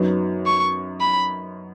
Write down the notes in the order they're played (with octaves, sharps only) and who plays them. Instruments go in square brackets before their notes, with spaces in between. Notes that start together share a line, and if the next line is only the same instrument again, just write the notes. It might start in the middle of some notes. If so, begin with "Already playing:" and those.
Already playing: [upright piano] F#2 F#3 B3 D#4
[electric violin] C#6
B5